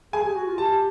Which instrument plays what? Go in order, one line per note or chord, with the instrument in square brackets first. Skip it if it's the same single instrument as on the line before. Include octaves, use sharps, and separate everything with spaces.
[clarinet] G#4 [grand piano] G#5
[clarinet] G4
F#4
F4
[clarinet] G4 [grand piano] A5